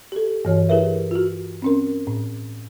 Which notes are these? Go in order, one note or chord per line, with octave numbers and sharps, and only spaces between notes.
G4 A4
G2 E3 C#5
E4 G4 G#4 A#4 B4 E5
F4 F#4
C4 C#4 A#4
A2